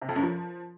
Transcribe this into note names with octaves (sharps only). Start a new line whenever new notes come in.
C3
F2
F#2
F3